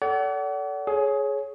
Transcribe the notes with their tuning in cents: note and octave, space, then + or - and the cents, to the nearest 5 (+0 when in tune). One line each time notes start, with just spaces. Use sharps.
A4 +0 D5 -40 F#5 +30
G#4 +20 C#5 +0